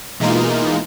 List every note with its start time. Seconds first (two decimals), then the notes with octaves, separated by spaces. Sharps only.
0.20 B2 E3 G#3 A#3 D#4 F4